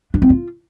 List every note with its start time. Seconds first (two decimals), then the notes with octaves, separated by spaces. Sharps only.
0.14 D4
0.22 C4
0.30 F4